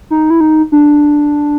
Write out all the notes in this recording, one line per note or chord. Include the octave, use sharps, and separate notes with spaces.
D#4
E4
D#4
D4